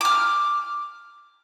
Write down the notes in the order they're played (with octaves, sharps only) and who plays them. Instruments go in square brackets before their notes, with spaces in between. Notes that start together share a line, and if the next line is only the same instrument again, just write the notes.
[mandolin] D6 F6